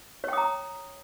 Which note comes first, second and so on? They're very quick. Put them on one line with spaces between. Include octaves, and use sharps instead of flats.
C#5 G5 D#6 A#5